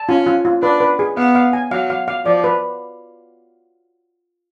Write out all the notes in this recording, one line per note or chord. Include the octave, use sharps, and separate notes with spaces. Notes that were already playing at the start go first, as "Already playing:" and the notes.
Already playing: A5
C#4 F4
F4
F4
D4 B4
B4
G#4
B3 F5
F5
G#5
F#3 F5
F5
F5
F3 D5
B4